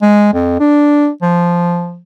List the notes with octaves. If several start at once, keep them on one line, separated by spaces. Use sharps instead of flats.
G#3
F2
D4
F3